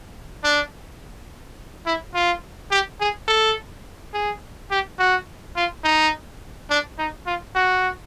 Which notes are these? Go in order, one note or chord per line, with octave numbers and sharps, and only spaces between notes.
D4
E4
F4
G4
G#4
A4
G#4
G4
F#4
F4
D#4
D4
D#4
F4
F#4